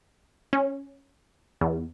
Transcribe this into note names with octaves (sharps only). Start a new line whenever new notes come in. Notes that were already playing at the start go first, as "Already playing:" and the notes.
C#4
E2